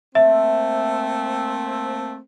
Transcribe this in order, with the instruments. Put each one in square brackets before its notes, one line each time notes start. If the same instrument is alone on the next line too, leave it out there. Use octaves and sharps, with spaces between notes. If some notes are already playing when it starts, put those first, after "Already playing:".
[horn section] A3 A#3 C4 [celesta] E5